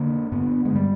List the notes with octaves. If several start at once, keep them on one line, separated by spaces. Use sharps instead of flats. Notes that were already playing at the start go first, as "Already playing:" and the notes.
Already playing: D3 A#3
G2 B3
G#3
G3